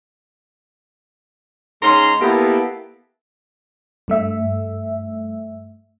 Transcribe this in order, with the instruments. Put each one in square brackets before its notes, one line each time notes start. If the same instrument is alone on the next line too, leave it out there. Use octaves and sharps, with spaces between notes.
[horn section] G#2 G#3 C#4 A#5 C6
A#3 B3 E4 G4 A4 B4
[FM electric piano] G2 A3 E5